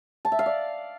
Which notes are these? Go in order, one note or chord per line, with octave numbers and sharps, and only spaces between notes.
A5
E5
F5
D5